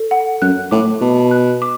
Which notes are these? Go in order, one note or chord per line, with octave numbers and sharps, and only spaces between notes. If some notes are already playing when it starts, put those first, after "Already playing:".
Already playing: A4
F#5
F#2 F#6
A2 D6
B2 A5
F#6
D6